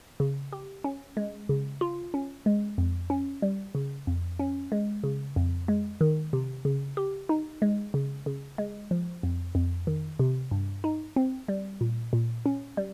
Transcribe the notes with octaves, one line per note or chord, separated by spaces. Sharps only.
C#3
G4
C#4
G#3
C#3
F4
C#4
G#3
F2
C#4
G3
C#3
F2
C#4
G#3
C#3
F2
G#3
D#3
C3
C#3
G4
D#4
G#3
C#3
C#3
G#3
F3
F2
F2
D#3
C3
G2
D#4
C4
G3
A#2
A#2
C#4
G3